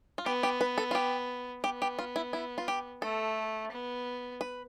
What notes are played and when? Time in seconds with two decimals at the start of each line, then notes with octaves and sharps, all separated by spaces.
0.18 F4
0.26 B3 G4
0.43 G4
0.61 B4
0.78 A4
0.91 F4
0.95 G4
1.64 B3 G4
1.82 G4
1.99 F4
2.16 E4
2.33 E4
2.58 F4
2.68 G4
3.02 A3 A4
3.71 B3
4.41 B4